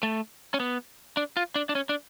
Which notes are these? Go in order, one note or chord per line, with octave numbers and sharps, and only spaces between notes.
A3
C#4
B3
D4
F4
D4
D4
C#4
D4